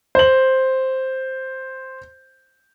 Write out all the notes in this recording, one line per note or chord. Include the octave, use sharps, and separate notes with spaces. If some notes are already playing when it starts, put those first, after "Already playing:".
C5 F#7